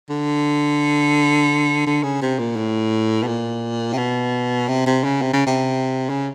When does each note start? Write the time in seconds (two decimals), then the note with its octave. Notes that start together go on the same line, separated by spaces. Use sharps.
0.10 D3
1.86 D3
2.03 C#3
2.22 C3
2.39 A#2
2.57 A2
3.23 B2
3.27 A#2
3.93 C3
3.98 B2
4.68 C3
4.86 C3
5.04 C#3
5.22 C3
5.33 C#3
5.47 C3
6.09 C#3